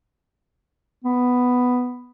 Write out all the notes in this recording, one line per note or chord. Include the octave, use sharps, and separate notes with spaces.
B3